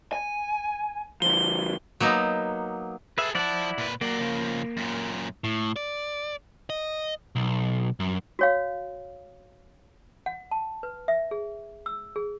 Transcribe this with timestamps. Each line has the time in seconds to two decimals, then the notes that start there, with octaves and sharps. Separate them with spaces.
0.13 G#5
1.22 D3 F3 G7
2.00 F#3 A#3 B3 D#4
3.18 G#4 A4 B4 E5
3.35 F3 E4 D5 F#5 A5
3.78 A#2 B4
4.01 F#3 A#3 D5
4.20 C#3 F3
4.77 F#2 A#2
5.44 A2
5.76 D5
6.70 D#5
7.35 B1
8.00 F#2
8.39 F#4 C#5 F5
10.26 F#5
10.51 A5
10.83 B4
11.08 E5
11.31 G#4
11.86 E6
12.16 G#4